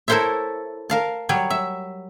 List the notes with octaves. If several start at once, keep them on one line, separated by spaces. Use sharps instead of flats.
E4 A4 A#4 C5 C#5 E5
A#4 F5 A5
F#3 G3 C#5
E5